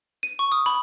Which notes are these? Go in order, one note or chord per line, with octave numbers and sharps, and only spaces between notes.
D#7
C#6
D#6
B5